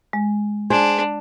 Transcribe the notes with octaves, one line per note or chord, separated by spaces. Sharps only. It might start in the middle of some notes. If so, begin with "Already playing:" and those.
G#3
D4 G#4 C5